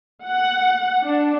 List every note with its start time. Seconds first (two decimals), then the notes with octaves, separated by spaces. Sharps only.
0.25 F#5
1.04 D4